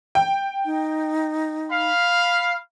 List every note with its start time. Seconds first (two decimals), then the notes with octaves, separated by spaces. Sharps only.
0.15 G5
0.65 D#4
1.70 F5 B5